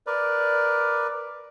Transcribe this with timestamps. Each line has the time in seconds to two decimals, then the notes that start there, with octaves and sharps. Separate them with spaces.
0.07 A#4 B4 D5